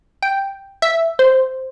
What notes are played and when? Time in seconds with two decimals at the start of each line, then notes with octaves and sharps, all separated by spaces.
0.22 G5
0.82 E5
1.19 C5